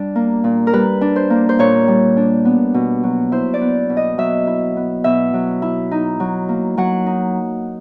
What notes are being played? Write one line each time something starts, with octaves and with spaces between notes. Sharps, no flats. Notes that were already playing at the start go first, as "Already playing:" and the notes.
Already playing: G3 D4
A#3
A#2
A#4
G3 B4
D4
C5
A#3
C5
A#2 C#5
G3
D4
B3
B2
F#3
E4 C5
D5
B3
B2
D#5
F#3 E5
E4
B3
B2 E5
F#3
E4
D#4
F#3
A#3
F#3 F#5
D#4